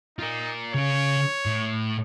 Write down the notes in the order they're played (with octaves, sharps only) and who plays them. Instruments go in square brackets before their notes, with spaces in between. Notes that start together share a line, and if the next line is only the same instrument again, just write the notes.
[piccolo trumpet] D#4 [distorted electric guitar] F4 A#4
[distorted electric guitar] C#3 F5 [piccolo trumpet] C#5
[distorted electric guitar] A2